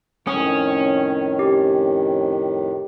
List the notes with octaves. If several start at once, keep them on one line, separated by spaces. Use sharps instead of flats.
F2 A2 D#3 C#4 D#6
G4